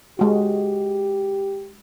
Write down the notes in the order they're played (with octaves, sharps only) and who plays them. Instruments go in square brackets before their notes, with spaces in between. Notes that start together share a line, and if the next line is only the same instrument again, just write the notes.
[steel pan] G#3 F#4 [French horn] G4